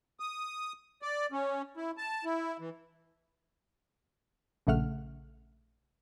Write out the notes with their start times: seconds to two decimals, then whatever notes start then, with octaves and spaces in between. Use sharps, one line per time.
0.20 D#6
1.02 D5
1.32 C#4
1.77 E4
1.98 A5
2.25 E4
2.60 E3
4.67 A#1 C#3 A3 F#5 F6